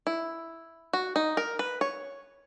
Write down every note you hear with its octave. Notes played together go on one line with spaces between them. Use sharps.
E4
F#4
D#4
A#4
B4
C#5